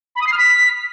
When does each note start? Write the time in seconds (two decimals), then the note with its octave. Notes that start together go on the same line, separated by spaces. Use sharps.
0.16 B5
0.21 D#6
0.27 C7
0.32 F6
0.38 B6